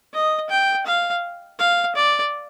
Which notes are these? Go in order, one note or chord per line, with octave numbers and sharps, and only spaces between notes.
D#5
G5
F5
F5
D5